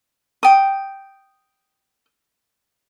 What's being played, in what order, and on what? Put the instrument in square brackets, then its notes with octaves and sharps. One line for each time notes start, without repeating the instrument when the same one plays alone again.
[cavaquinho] G5 D#6